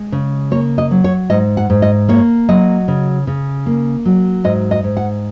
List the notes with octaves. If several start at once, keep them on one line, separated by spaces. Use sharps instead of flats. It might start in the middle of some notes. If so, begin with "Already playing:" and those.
Already playing: G#3
C#3
A#3 C#5
D#5
F#3
C#5
G#2 D#5
F#5
G#2
D#5
A#3 C#5
F#3 D#5
C#3
C#3
A#3
F#3
G#2 D#5
D#5
G#2
F#5